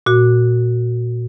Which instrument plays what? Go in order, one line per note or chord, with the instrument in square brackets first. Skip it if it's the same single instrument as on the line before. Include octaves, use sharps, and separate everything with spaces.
[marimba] A#2 F#4